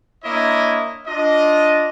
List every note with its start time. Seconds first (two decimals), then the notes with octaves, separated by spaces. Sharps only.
0.24 A#3 D4 E4 C#5 D#5
1.07 D4 F4 D#5